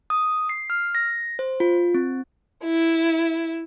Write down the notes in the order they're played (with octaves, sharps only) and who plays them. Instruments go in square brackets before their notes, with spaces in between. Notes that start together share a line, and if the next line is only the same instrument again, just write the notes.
[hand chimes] D#6
C7
F6
A#6
C5
F4
C4
[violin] E4